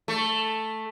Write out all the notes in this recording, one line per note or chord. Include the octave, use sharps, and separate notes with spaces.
A3